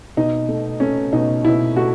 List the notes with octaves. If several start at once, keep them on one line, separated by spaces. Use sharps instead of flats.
B2 D#4
A3
A3 C#4
B2 D#4
B2 E4
A3 F#4